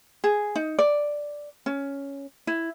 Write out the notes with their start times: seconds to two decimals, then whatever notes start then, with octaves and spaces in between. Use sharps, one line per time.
0.24 G#4
0.56 D#4
0.79 D5
1.66 C#4
2.47 E4